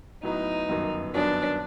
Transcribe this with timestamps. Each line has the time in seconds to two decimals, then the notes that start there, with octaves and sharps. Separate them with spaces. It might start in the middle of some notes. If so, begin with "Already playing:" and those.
0.23 A2 F#3 B3 D#4
0.68 G1 F#2 D#3 F#3 B3
1.14 G1 F#2 D#3 F#3 B3 D4